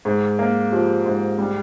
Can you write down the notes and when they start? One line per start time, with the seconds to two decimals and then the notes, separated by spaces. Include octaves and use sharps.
0.05 G#2 G#4
0.39 A#3
0.72 F3 G4
1.06 G#2
1.39 G3